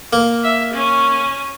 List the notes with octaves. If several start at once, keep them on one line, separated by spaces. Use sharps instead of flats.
A#3
E5
C#4